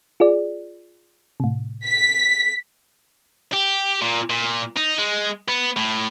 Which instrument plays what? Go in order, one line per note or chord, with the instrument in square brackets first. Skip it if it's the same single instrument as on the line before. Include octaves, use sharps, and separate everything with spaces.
[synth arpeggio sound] F4 G#4 D5
A2 C3
[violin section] B6
[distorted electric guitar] G4
A#2
A#2
D#4
G#3
B3
A2